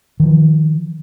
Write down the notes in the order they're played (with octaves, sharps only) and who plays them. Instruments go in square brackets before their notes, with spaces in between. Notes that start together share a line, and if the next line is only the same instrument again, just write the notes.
[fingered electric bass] D#3 F3